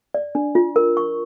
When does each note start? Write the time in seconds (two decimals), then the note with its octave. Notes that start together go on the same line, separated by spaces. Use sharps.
0.14 D5
0.35 D4
0.55 F4
0.76 A#4
0.97 C#6